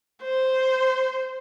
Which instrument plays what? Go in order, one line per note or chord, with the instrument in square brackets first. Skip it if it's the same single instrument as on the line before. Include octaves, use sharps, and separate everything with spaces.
[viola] C5